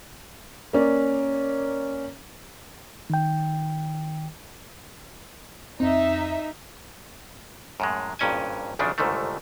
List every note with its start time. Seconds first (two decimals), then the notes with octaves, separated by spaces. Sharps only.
0.73 A#3 C#4 D5
3.10 D#3 G5
5.80 F2 C4 D#4 E5
7.80 F#2 A2 G#3
8.19 G#1 G2 A#2 C#4 D#5 G#5
8.79 B1 E2 C#3 F3 D4
8.98 G1 C2 G#2 D3 D#3 A3